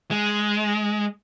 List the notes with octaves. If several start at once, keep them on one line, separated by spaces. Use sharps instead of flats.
G#3